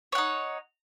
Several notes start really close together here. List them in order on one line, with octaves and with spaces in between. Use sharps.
C#5 F#5 D#4